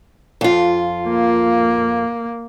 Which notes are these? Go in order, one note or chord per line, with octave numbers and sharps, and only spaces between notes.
F2 F4
A#3